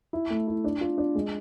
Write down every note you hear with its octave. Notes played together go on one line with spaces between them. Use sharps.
E4
A3
E4
D4
F4
D4
G#3